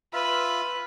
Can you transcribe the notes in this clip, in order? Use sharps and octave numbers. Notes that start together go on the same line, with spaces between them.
F4 B4 E5